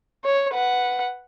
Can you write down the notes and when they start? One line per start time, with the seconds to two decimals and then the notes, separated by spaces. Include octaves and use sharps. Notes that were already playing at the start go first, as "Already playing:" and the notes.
0.24 C#5
0.54 B4 F#5